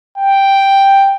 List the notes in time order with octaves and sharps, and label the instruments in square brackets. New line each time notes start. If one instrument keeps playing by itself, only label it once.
[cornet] G5